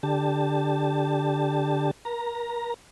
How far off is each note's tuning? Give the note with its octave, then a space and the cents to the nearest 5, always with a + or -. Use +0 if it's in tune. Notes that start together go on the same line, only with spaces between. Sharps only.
D3 +0 G4 +10 A5 +0
A#4 +30 A#5 +0